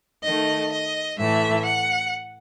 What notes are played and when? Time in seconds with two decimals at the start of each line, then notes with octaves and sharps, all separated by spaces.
0.24 D#3 A3 D#5
0.71 D#5
1.18 A2 E3 A3 E5
1.66 F#5